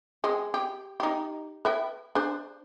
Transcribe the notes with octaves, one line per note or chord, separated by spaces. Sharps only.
G#3 C4
G4
D#4 G4
B4 E5 G5
D4 C5